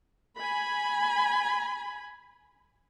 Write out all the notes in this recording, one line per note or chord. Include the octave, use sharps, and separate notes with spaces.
G#5 B5